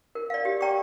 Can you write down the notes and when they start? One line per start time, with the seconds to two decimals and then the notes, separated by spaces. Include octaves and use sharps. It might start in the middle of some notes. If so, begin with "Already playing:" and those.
0.15 A#4
0.30 D5 F5
0.45 G4
0.61 D5 G5 A#5 C#6